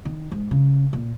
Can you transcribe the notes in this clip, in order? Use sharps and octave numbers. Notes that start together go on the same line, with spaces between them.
D#3
G#2
C#3
A#2